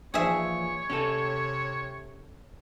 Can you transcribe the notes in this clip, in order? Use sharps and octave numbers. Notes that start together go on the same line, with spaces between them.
A#2 E3 F3 G#4 C#5 E5
C3 C#4 G4 A4